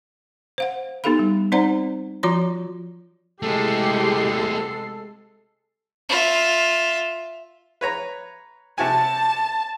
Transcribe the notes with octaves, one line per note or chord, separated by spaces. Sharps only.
C5 F5 F#5
B3 D#4 G4 A4 F5 B5
G3
C4 D#4 C5 D5 F#5 A#5
F3 F4 F#4 C#5 A#5 C6
C3 G#3 A3 B3 E4 G4 A4 C7
F4 E5
B4 C#5 A#5
C3 F#4 G#5 A5